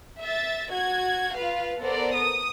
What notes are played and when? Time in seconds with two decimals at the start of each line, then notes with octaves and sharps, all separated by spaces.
0.21 E5 A6
0.71 F#4 G#6
1.34 F4 B4 F5
1.80 B3 A4 A#4 C5 D5
2.14 D#6